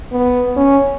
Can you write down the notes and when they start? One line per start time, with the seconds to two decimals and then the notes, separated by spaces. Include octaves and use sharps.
0.12 B3
0.56 C#4